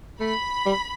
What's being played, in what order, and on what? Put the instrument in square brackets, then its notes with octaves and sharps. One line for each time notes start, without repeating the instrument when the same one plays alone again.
[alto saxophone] A3 [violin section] B5
[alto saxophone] G3